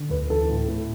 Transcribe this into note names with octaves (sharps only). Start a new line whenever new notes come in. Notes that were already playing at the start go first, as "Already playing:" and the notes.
Already playing: D3
D2 B4
E3 A4
A2
A2